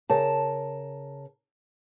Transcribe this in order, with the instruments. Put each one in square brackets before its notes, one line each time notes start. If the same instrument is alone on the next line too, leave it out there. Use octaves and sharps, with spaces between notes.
[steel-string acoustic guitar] C#3 A#4 A5